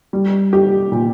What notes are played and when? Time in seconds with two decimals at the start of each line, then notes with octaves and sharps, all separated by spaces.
0.13 G3
0.53 G4
0.92 A#2